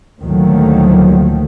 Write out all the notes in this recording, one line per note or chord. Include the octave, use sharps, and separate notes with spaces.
D2 A#2 D#3 F3 F#3 A3